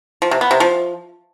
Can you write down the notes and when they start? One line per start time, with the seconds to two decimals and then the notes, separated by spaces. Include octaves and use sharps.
0.22 F3
0.31 C3
0.41 B3
0.51 C3
0.60 F3